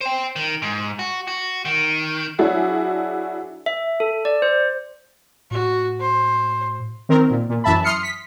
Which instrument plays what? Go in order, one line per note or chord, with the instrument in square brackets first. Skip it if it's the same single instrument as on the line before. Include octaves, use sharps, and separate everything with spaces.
[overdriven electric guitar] C5 G5
D#3
G#2
F#4
F#4
D#3
[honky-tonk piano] F#3 D4 E4 F#4 G#4
[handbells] E5
A4
D5
C5
[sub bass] A2 [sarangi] F#4
[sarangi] C5
[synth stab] D#3 C4 A#4
A#2
A#2
F#2 E3 E5 A5 B5
C6 D#6 F6 C7 C#7
B6